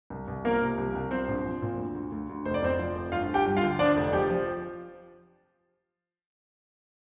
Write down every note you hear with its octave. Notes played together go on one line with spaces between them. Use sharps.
C2
C2
F3 A#3 A#4
C3
C2
C2
F3 C4 C5
A#1
F3
A#2
D2
D2
D2
D2
F1 C5
D5
F2 C4 C5
F3
F1
G1 F4 F5
G1
G4 G5
G2
F4 F5
D3
F3 D4 D5
F1
F3 G4
F3